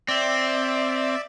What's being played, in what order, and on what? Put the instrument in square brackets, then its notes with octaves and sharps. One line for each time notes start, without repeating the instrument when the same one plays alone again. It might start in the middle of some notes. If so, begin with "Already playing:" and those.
[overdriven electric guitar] C4 [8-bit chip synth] D5 E5